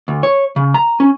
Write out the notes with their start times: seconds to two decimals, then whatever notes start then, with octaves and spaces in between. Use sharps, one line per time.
0.08 D2
0.23 C#5
0.56 C#3
0.74 A#5
1.00 C#4